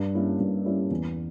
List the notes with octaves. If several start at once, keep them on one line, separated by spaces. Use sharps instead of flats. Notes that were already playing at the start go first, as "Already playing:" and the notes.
Already playing: G2
G3 A#3 C#4 E4
G2
G3 A#3 C#4 E4
E2